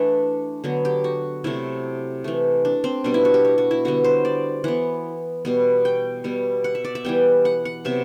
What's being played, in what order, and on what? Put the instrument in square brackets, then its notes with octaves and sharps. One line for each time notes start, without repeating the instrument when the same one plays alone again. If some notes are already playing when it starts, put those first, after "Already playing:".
Already playing: [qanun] E3 A3 D4
D3 F#3 B3
G4
F#4
C3 F#3 A3 E4
E3 A3
D4
C4
B2 G3 B3 D4
E4
F#4
G4
F#4
F#4
E4
D3 G3 B3 F#4
C5
D5
E3 B3 F#5
B2 G3 B3
G5
B2 G3 B3
F#5
E5
D5
E5
E3 G3 B3 G5
F#5
F#5
C3 F#3 B3 E5